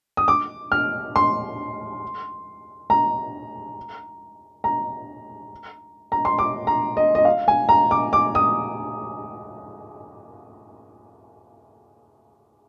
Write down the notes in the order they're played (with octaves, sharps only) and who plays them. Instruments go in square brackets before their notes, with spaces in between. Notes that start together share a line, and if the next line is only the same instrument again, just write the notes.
[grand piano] D#6
D6
F6
C6
A#5
A#5
A#5
C6
D6
A#5
D#5
D#5
F5
G#5
A#5
D6
D6
D#6